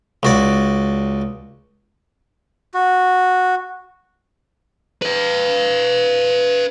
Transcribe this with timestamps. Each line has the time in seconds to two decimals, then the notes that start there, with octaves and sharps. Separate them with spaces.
0.23 C#2 F#4 D5
2.74 F#4
5.02 B4 F5